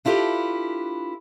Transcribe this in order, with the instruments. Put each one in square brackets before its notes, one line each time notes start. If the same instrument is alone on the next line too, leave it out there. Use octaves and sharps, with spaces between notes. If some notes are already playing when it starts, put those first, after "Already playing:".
[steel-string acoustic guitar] D4 E4 F4 G4 A4 B4